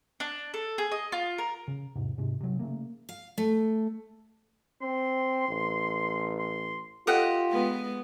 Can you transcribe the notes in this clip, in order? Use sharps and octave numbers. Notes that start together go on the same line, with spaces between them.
D4
A4
G#4
D#5
F4
A#4
C#3
E2 G#2 C3
G#2 C3
C3 F#3
C#3 A3 A#3
F5
A3
C4 C6
A1
C6
F4 G4 A4 D#5 F#5
G#3 B3